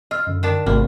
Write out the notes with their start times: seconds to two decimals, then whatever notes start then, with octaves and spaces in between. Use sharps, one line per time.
0.11 F4 D#5 E6 F6
0.27 F#2 D3
0.43 D#3 D4 A5
0.66 G#1 C3 A3 A#3 C4